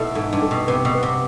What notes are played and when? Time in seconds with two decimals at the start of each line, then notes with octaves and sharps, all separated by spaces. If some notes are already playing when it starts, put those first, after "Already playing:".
Already playing: B2 E4 A4
0.15 G#2 A4
0.33 G2
0.42 A4
0.51 B2
0.68 C3 B3
0.85 B2
0.95 B3
1.03 C3